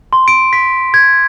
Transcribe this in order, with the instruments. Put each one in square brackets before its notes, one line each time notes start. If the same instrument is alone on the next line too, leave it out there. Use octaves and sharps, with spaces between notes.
[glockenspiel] C6
D7
B6
G#6